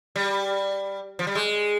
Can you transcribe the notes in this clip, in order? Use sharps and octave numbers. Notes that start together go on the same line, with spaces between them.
G3
F3
G3
G#3